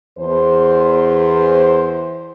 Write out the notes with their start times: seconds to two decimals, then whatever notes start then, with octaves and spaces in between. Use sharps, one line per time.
0.19 E2 C5